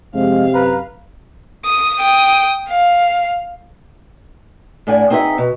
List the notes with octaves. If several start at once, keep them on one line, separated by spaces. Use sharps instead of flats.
F2 C3 G#3 F5
F#2 B4 A#5
D#6
G5 D#6
F5
A2 D4 D5 F#5 G#5
C4 D#4 G#4 B4 E5 F#5
B2